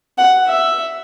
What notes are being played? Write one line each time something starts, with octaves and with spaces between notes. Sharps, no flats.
F#5
E5